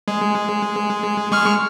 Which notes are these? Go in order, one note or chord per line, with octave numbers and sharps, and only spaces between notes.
G#3
G#3 C#6 F6